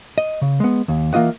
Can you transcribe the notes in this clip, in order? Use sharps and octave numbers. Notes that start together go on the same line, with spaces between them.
D#5
C#3
G#3 B3
D#2
E3 A#3 F4 D#5 F#5